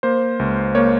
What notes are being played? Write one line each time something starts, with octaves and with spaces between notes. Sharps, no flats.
A#3 C5
C#2
A#3 C#5